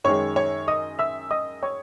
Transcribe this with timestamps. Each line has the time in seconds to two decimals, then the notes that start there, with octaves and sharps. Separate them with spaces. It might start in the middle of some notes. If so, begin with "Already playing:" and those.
0.04 F#2 D#3 G#3 C#5 C#6
0.36 C#5 C#6
0.68 D#5 D#6
0.99 E5 E6
1.31 D#5 D#6
1.63 C#5 C#6